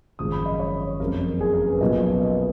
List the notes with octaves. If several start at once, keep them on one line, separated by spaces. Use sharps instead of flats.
G#1 F#2 F3 G#3 C#4 D#6
B5
D#5
C#5
C#5
F#1 F2 C#3 A#4
A#4
G#4
A#4
B4
B1 A#2 F3 B3 D#5
D#5